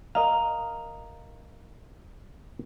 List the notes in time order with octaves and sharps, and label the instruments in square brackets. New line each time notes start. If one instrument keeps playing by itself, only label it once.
[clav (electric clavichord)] A#4 D#5 F5 [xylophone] A#5